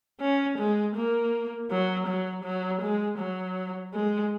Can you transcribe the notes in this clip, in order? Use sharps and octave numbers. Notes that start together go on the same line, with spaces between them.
C#4
G#3
A#3
F#3
F#3
F#3
G#3
F#3
G#3